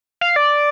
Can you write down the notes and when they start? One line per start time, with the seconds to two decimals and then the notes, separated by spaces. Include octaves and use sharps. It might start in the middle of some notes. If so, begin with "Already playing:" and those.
0.21 F5
0.36 D5